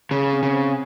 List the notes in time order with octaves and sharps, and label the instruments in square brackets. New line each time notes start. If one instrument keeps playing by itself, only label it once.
[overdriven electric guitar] C#3 [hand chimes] G#4
[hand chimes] C4
[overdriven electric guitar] C#3
[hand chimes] C5